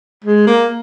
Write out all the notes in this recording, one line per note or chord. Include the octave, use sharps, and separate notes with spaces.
G#3
A#3